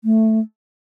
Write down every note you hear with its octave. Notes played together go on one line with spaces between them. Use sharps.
A3